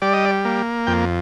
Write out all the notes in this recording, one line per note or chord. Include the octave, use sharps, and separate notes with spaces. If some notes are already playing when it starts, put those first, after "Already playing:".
G3 D5
D#5
D5
A#3
F2 G5